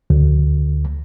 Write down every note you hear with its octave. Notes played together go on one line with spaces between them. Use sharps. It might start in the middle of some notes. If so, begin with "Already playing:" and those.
D2